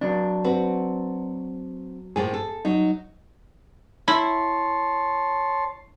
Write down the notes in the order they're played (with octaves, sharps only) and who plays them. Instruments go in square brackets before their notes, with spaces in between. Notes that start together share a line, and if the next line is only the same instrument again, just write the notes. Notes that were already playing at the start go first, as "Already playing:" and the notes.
[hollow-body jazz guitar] F#3 D4
[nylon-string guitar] C4 F#4 B4
[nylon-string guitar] A2 F3 A#3 [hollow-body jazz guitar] G#4
[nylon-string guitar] A4
[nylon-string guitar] F#3 [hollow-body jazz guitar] D#4
[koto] E4 [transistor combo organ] C#5 A5 C6